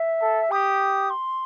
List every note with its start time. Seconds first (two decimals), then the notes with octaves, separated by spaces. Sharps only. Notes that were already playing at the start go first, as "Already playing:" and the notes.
Already playing: E5
0.22 A4
0.51 G4 D#6
1.10 C6